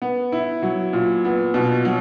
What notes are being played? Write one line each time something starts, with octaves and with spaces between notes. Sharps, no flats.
B3
E4
F#3
A#2
B3
B2
F#3